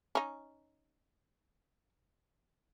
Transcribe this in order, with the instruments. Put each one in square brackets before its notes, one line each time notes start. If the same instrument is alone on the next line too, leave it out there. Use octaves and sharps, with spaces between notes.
[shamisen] C#4 D#4